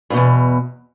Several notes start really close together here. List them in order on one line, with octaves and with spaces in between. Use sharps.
G2 B2 E2